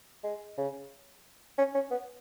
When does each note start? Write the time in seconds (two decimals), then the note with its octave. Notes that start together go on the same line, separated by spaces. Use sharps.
0.24 G#3
0.58 C#3
1.58 C#4
1.75 C#4
1.91 B3